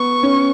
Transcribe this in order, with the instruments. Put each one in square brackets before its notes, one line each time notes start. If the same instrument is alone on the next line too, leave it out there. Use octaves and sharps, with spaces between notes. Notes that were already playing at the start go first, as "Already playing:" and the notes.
Already playing: [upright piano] B3 [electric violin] C#6
[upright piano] C#4